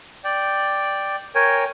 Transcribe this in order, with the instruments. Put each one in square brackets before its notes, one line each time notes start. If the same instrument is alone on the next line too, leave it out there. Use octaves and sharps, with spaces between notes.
[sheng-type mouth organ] D5 G5
A#4 C#5 G5 G#5